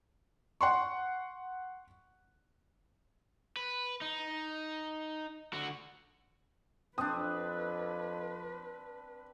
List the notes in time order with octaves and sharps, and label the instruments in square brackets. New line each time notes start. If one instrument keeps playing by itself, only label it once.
[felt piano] F#5 C6 C#6
[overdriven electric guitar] B4
D#4
D3 F#4
[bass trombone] F2 [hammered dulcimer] C4 D4 [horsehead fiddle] B4 [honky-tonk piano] D#6